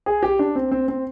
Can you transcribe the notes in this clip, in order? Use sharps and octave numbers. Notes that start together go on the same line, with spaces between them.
G#4
G4
D4
C4
C4
C4